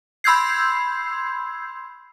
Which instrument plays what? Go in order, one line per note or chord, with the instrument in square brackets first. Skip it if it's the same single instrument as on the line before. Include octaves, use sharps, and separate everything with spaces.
[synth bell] B5 C6 E6 G6 G#6 C7